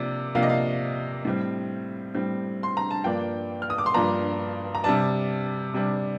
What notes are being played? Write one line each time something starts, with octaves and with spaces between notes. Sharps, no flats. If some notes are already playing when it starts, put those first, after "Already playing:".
Already playing: C3 F3 A#3 D4
C3 F3 A#3 D4 F5
D#5
F5
A2 G3 C4
A2 G3 C4
C6
A#5
A5
G2 F3 A#3 D4 G5
F6
D#6
D6
C6
G2 F3 A#3 D4 A#5
A#5
C3 G3 D4 A5
C3 G3 D4